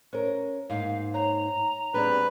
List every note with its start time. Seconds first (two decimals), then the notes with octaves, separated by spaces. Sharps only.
0.13 C#4 A#4 C5
0.70 G#2 A#3 D#4 F5
1.14 C#5 A#5
1.94 G3 B3 C4 D4 G#4 B4 D5